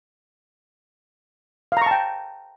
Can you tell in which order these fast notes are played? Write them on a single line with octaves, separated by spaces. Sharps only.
F5 A#5 C#6 A5 G5